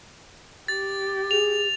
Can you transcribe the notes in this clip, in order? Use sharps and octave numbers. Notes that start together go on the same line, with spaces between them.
G4 A6
G#4 F7